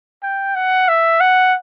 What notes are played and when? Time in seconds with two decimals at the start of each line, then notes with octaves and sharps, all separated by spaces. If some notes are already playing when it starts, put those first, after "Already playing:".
0.23 G5
0.55 F#5
0.88 E5
1.21 F#5